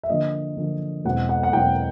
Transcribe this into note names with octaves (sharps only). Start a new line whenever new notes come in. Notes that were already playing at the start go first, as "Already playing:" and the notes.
E5
D3 F3 A#3 D#5
D3 F3 A#3
E2 B2 G#3 C4 E4 F#5
F#5
F#5
E2 B2 G#3 C4 E4 G5